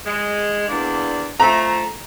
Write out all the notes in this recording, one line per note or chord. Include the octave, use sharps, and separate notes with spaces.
G#3
E2 A#3 D4
F3 A3 A#5